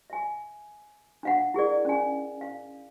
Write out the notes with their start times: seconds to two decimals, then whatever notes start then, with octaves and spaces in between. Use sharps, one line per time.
0.10 E5 G#5
1.23 D4 F5 F#5
1.54 E4 G#4 A#4 D5
1.85 C#4 G#5
2.41 F5